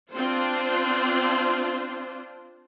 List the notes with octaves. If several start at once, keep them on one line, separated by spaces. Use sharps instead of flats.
C4 D4 F4 C5